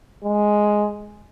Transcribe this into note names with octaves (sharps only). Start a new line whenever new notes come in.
G#3